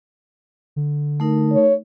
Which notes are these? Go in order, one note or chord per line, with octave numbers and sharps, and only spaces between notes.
D3
A3 D#4 A#4
C#5